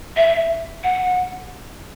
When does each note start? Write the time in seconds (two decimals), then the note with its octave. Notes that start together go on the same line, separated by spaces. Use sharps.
0.17 E5
0.84 F#5